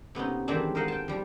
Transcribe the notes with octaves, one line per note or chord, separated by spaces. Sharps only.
C3 B3 C#4 D#4
D#3 E3 G3 G#3 C4 D4
A#4 C5 D#5 F5 F#5
G5 A5
F3 G3